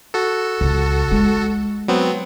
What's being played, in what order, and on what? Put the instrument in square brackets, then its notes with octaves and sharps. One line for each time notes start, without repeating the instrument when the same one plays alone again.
[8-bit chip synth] F#4 A4
[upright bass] C#2
G#3
[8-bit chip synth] F#3 B3 C4